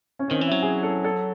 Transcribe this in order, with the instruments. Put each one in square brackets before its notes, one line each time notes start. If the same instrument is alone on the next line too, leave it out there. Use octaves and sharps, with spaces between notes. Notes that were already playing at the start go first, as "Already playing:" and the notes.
[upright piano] C#4
C4
[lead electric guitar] D#3 [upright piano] C#4
[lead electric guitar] E3
[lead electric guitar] F#3 [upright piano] E4
[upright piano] G#4
A4
A4